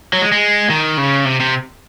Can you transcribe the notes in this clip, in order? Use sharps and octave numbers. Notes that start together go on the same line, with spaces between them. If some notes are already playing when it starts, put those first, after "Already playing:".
F#3
G#3
G#3
D#3
C#3
C3
C3